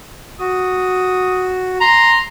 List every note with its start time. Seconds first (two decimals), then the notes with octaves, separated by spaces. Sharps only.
0.40 F#4 D#6
1.81 A#5 C6